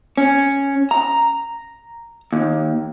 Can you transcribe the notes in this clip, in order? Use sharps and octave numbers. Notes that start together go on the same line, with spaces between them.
C#4
A#5
D#2